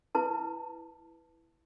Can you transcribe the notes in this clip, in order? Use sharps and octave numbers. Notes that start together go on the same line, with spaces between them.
E4 B4 A5